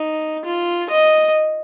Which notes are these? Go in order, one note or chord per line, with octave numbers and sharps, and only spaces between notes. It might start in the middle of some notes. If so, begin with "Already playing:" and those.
Already playing: D#4
F4
D#5